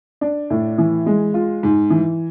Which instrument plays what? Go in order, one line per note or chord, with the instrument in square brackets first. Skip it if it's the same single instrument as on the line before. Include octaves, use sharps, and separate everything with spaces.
[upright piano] D4
A2
E3
G#3
F4
G#2
E3